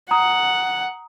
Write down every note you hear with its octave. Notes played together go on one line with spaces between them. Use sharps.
F#5 A#5 D#6